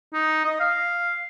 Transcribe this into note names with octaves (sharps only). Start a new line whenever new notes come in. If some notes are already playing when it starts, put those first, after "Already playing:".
D#4
D#5
F5